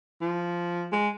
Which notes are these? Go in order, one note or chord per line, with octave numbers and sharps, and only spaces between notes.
F3
G#3